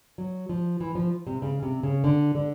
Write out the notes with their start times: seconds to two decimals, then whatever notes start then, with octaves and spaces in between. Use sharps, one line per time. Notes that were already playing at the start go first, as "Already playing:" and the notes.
0.18 F#3
0.49 F3
0.80 E3
0.95 F3
1.27 C3
1.42 C#3
1.63 C3
1.83 C#3
2.04 D3
2.35 D3